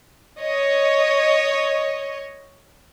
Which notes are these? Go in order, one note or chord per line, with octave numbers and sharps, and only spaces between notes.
C#5 D#5